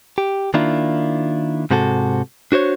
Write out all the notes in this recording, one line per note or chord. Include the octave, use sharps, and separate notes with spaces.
G4
D#3 A#3 D4 E4 F4
G#2 C3 F#4 A4
D4 F#4 C5 C#5